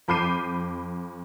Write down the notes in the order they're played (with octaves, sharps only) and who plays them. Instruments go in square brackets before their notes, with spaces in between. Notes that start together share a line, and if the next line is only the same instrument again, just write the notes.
[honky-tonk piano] F2 B5 D6 G6 C7 D#7